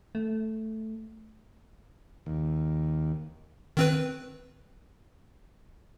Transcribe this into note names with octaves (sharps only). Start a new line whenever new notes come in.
A3
D#2
D#3 C4 B4